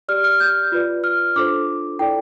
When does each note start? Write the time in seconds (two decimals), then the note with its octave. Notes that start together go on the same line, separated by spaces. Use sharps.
0.09 G4 D5 F6
0.24 F6
0.40 G6
0.72 F4 B4 D5
1.04 F6
1.36 D4 F4 A4 C5 D6
1.99 E4 A4 D5 G5